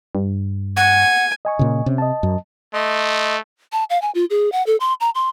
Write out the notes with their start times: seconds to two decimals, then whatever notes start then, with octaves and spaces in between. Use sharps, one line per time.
0.15 G2
0.77 F#5 G#5
1.45 D#5 G#5 C#6
1.59 A#2 C#3
1.86 C3 C#4
1.98 D#5 A5
2.23 F#2
2.74 A3 D#5 C6
3.72 A5
3.90 F5
4.02 G#5
4.15 F4
4.30 G#4
4.52 F#5
4.66 A4
4.80 C6
5.01 A#5
5.15 C6